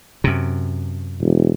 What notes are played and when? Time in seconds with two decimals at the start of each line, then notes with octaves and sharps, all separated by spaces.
0.24 F#2 C3
1.21 E1